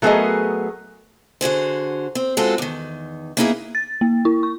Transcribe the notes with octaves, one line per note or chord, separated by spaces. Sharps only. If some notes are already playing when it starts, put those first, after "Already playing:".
F#3 A3 B3 G#4 A#4 D#5
D3 F#4 G#4 C5
C4
G#3 C4 F4 F#4 A4
E2 D#3
A#3 B3 D#4 E4 F#4 G#4
A6
A#3
E4
C#6